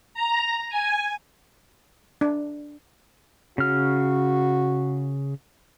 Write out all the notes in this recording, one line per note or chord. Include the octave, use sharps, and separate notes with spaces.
A#5
G#5
D4
C#3 F#4 F6